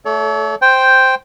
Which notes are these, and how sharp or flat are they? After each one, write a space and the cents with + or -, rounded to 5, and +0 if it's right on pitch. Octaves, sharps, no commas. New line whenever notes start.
A3 +0 A4 -25 C#5 +40
C5 +0 G5 +0